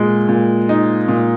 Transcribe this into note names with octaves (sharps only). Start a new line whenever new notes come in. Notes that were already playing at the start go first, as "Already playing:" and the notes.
Already playing: A#2 G#3
A#2
D#4
A#2